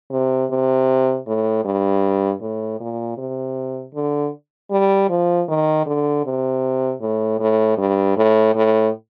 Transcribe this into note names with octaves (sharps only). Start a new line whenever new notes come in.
C3
C3
A2
G2
A2
A#2
C3
D3
G3
F3
D#3
D3
C3
A2
A2
G2
A2
A2